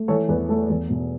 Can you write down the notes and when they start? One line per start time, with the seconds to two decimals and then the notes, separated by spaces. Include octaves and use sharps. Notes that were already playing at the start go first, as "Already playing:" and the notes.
Already playing: A3
0.08 E3 A4 C#5
0.28 E2 B4
0.49 A3 A4
0.70 E2
0.90 B2